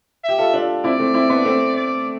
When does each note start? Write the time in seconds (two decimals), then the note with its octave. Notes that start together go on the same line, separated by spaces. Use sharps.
0.24 G4 E5
0.38 F4 A4
0.54 D4 F4
0.84 C4 E4 D5
0.99 A3 C4
1.14 C4 E4
1.29 B3 D4
1.45 A3 C4
1.76 D5